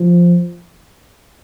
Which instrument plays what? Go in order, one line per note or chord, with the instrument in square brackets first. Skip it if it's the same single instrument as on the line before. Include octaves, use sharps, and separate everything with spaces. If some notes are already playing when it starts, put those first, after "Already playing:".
Already playing: [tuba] F3